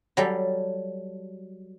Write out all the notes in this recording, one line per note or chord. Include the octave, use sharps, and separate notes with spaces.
F#3 G3 A4